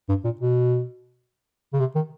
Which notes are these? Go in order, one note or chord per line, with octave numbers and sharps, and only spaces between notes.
G2
A#2
B2
C#3
C3
D#3